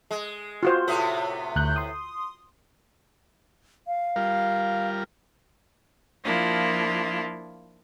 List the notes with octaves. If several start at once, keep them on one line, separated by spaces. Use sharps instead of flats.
G#3
F4 F#4 C5
A2 C3 B3
D2 F#6 G6
C6 D#6
F5
G3 F4 A#4
F3 A#3 D4 E4 F4